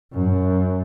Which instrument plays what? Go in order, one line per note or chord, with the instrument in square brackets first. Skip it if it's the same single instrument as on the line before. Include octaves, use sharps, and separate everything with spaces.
[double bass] F#2